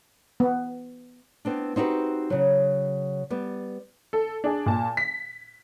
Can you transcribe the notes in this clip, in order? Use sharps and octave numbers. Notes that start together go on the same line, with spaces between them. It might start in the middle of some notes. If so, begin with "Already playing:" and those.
B3
B3 C4 D4
C4 D#4 F#4 G4 B4
C#3 F#3
G3 B3
A4
D4 G#4
A#2 A5
B6